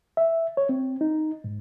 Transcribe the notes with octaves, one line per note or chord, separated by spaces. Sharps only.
E5
C#5
C4
D#4
G#2